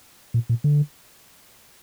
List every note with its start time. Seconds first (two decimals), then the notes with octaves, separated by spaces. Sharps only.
0.34 A#2
0.49 A#2
0.64 D3